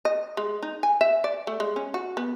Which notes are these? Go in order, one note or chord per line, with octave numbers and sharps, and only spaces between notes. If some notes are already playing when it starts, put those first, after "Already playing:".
D#5
G#3
D#4
G#5
E5
D5
A3
G#3
C#4
F#4
B3